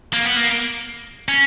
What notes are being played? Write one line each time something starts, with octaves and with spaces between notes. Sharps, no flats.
A#3
B3
A#3
C#4